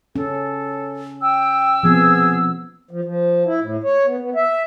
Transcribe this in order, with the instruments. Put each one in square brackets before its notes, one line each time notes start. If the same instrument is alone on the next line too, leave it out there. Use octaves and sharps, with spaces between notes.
[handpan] C#4 [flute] A4
[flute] G5 [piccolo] E6
[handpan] F3 B3 C4 [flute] G#4
[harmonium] F3
F3
E4
A2
C#5
B3
B3
E5